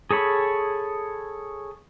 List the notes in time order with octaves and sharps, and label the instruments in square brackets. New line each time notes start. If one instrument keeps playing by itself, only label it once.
[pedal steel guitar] G#4 A4 C#5 B5